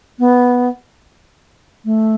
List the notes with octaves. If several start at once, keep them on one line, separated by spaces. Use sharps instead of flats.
B3
A3